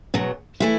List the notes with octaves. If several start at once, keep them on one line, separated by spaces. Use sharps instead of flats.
E2 B2 F#3
E3 A3 E4